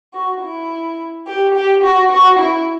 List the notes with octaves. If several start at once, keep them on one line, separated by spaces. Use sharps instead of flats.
F#4
E4
G4
G4
F#4
F#4
E4